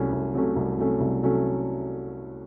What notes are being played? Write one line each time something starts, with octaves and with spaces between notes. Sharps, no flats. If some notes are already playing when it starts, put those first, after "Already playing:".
Already playing: C2 C3 F#3 A3 C#4
C2
C3 F#3 A3 C#4
C2
C3 F#3 A3 C#4
C2
C3 F#3 A3 C#4